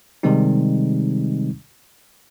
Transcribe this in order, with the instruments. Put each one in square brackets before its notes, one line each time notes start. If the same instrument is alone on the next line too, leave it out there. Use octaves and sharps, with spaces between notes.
[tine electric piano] C3 D#3 G3 G#3 C4 D#4